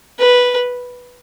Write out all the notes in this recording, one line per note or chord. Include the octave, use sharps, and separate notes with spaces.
B4